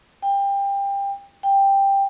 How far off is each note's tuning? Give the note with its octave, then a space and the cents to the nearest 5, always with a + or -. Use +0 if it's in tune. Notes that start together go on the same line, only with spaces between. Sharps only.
G5 +25
G5 +10